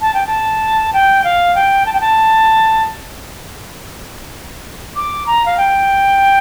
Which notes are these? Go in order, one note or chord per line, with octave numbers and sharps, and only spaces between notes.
A5
G5
A5
G5
F5
G5
A5
G5
A5
D6
A#5
F5
G5